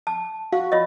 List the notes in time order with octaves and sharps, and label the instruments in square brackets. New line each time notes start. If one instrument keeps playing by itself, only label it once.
[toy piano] A5
[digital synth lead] F#4 [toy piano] F5
[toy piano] F4 C#5 D#5